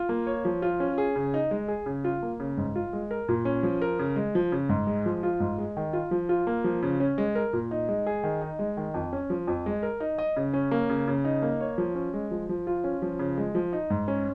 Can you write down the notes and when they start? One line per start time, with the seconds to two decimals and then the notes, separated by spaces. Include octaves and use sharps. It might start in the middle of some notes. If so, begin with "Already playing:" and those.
Already playing: F4
0.09 A#3
0.27 C#5
0.45 F3
0.62 F4
0.80 C#4
0.98 G#4
1.15 C#3
1.34 D#4
1.51 G#3
1.68 G#4
1.86 C#3
2.04 F4
2.23 A#3
2.40 C#3
2.57 G#2
2.76 F4
2.93 G#3
3.11 A#4
3.29 A#2
3.45 C#4
3.63 F3
3.82 A#4
3.99 C#3
4.16 G#3
4.35 F3
4.52 C#3
4.69 G#2
4.87 G#3
5.06 F3
5.23 F4
5.40 G#2
5.58 G#3
5.77 D#3
5.93 F4
6.11 F3
6.29 F4
6.47 A#3
6.64 F3
6.83 C#3
7.00 C#4
7.18 G#3
7.35 A#4
7.53 A#2
7.71 D#4
7.89 G#3
8.07 G#4
8.24 D#3
8.42 D#4
8.59 G#3
8.77 D#3
8.94 F2
9.13 C#4
9.30 F3
9.47 F2
9.66 G#3
9.83 A#4
10.00 D#4
10.18 D#5
10.36 C#3
10.54 C#4
10.71 A#3
10.89 C#3
11.07 C#3
11.25 D#4
11.42 A#3
11.60 C#5
11.78 F3
11.95 C#4
12.14 G#3
12.31 F3
12.49 F3
12.67 F4
12.84 C#4
13.02 F3
13.19 C#3
13.38 G#3
13.55 F3
13.73 D#4
13.90 G#2
14.08 C#4